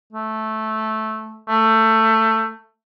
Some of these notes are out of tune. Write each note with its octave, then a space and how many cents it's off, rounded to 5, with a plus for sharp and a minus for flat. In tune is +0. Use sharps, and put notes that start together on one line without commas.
A3 -10
A3 +15